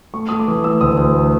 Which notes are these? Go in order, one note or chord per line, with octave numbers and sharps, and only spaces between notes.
A3 C#6
A3 D#6
D6
E3
A3 E6
D2 D#6
D2
A3